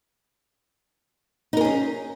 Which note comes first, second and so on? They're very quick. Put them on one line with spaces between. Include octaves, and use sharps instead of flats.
D#4 A#4 G#4 C#4